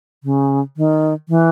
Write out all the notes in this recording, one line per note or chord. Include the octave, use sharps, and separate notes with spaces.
C#3
D#3
E3